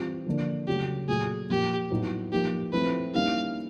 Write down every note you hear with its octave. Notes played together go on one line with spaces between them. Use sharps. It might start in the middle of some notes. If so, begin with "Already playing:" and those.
Already playing: E3 G3 C4 F4
D3 F3 A#3 D4
C#3 F#3 A3 G4
A#2 F#3 A3 G#4
A#2 F3 A#3 G4
A2 F#3 B3 D#4
F3 A#3 D#4 G4
F3 A3 C4 E4 B4
D#3 G3 A#3 C#4 E4 F5